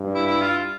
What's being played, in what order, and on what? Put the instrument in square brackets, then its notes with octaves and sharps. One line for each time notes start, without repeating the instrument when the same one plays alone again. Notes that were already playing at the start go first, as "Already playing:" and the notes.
Already playing: [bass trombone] G2
[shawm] E4
E4
F4